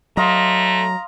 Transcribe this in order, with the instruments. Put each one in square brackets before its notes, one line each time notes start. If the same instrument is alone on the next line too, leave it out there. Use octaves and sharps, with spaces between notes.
[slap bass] F#3 [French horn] A3 [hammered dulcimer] D#5 F5 C6 [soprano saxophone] A#5